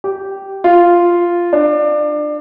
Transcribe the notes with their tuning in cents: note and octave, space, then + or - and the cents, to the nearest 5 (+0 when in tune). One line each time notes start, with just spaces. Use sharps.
G4 -10
F4 -5
D4 +25